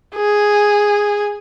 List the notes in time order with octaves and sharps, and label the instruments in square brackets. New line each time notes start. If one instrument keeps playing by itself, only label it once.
[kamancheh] G#4